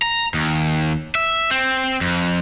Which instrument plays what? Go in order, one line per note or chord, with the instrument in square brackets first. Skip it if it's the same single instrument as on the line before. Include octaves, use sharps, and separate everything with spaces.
[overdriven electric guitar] A#5
D#2
E5
C4
F2